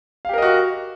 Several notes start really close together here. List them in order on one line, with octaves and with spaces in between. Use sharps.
F5 G4 A#4 D#5 F#4